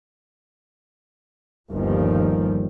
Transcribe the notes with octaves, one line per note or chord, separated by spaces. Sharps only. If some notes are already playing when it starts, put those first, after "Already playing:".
G1 D#2 D#3 F3 G3